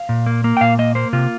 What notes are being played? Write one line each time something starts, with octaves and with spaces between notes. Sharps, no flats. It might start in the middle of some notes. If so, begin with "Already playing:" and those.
Already playing: F5
A#2
A#3
A#3
G5
A#2 F5
A#3 D#5
A#3 C5
C3 F4